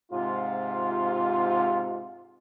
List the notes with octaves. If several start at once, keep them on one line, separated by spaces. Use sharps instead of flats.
G#2 C3 F4